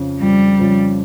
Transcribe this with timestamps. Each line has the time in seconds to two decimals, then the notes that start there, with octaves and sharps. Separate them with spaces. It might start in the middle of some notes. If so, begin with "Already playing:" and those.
Already playing: F2 C#3 F3
0.21 F2 G3
0.59 C#3 F3